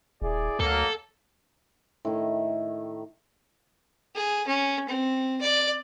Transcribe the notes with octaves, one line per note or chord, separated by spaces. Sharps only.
D#1 E4 G#4 D5
D2 B2 F#3 A#3 A4
A2 D#3
G#4
C#4
C4
D5